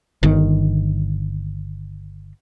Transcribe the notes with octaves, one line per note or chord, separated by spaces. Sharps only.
G1 D#3